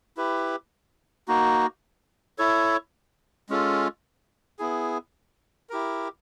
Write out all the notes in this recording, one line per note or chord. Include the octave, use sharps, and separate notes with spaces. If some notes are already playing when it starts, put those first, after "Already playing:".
E4 G4 B4
A#3 D#4 F#4
E4 A4 C#5
G#3 C#4 F4 A4
B3 E4 G#4
E4 G4 A#4